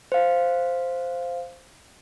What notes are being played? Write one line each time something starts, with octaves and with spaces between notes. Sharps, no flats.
C5 F5